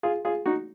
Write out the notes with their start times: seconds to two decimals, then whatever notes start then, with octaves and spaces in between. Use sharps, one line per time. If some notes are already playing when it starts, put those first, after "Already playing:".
0.03 F4 G#4
0.25 F4 G#4
0.46 D#4 F#4